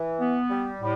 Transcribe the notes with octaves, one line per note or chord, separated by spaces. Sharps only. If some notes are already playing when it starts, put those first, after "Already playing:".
Already playing: E3
B3
G3
A2